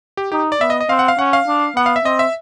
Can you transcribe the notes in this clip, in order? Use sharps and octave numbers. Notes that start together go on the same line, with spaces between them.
G4
D#4 G4
D5
B3 E5
D#5
D#5
C4 F5
F#5
F5
C#4 F#5
F5
D4
B3 F#5
F5
E5
C4 D#5
E5